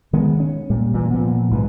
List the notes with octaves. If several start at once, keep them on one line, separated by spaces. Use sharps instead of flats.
D#3 G#3 B3
C#4
A#2 G3
A#2 E3
A#2 F3 B3
B1 G#2 E3